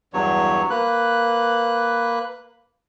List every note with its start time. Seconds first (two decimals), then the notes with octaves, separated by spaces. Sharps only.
0.14 E2 G2 F#3 C#5
0.70 A#3 B4 F#6